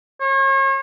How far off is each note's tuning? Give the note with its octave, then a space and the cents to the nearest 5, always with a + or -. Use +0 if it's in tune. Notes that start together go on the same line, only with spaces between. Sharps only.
C#5 -40